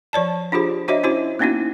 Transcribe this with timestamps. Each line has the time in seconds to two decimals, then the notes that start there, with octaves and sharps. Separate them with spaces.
0.13 F3 C#5 D5 A5
0.52 D4 F4 G4 G#4 C5
0.88 D4 F#4 C5 C#5 D#5 E5
1.03 C#4 E4 F#4 C5
1.39 A#3 B3 C#4 D#4 E4 F#4